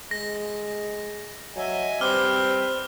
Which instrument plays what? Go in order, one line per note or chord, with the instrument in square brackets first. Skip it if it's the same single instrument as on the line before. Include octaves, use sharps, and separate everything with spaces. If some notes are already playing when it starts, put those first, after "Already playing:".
[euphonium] G#3 [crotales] A#6
[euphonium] F#3 [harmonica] D#5 E5 G#5
[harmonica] G3 B4 C5 [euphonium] C4 [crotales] D6 F6 G7